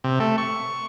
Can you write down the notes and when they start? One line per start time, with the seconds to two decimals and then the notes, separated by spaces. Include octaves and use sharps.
0.04 C3
0.20 A3
0.38 C#6